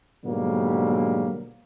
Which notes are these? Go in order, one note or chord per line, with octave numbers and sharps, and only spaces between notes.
G#2 B2 D3 F#3 G3 A#3